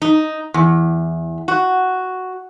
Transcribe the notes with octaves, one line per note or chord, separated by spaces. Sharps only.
D#4
E2
F#4